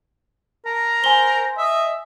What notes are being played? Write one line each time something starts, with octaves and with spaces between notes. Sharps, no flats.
A#4 A5
C5 G#5 G7
D#5 E5